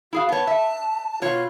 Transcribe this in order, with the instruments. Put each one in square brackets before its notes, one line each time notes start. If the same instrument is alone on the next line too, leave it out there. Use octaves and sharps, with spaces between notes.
[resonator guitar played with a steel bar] E4 G#4 F5 [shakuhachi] F#4
[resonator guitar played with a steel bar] B3 C#5 [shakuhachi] A5
[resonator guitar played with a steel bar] E5
[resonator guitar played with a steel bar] B2 C#5 [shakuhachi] F4